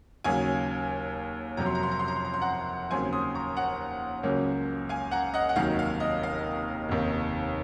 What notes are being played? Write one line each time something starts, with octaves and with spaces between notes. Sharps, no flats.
D#2 C#3 F#3 F5 G#5
F2 C3 F#3 A#5
C6
A#5
C6
A#5
C6
A#5
C6
A#5
C6
F#5 A#5
D#2 C#3 F#3 C4 G#5 C6
C6 D#6
A#5 C#6
F#5 A#5
C#2 C#3 F#3 A#3 C#4
F5 G#5
F#5 A#5
D#5 F#5
F#5
F1 D#2 D#3 F#3 F5
F5
D#5
F5
F1 D#2 D#3